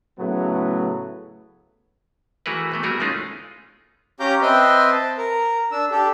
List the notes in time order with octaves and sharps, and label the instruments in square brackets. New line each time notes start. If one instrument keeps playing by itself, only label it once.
[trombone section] A2 C#3 F#3 A3 B3
[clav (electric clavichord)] E3 A3 F#4 G#4 A#4 B4
E3 A3 B3
G3 B3 F#4 G#4 A#4
G#3 A3 C#4 D#4 F4 G#4
[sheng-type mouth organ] C#4 G4 F5 A#5 D6 G6
C4 B4 D#5 E5 G5 C6
A5
A#4
D4 E6
D4 G4 A4